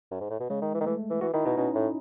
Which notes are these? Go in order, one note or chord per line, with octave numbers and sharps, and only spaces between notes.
F#2
G#2
A2
B2
C#3 G#3
D#3
E3
D#3
E3 A3
E3
E3 F#4
D#3 E4
B2 D#4
B2 C#4
A2